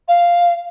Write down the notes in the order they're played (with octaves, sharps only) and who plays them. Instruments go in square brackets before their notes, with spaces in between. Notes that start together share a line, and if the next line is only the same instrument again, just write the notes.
[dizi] F5